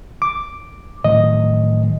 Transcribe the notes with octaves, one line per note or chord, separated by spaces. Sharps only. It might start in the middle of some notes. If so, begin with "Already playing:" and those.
D6
A2 D#3 F#3 D#5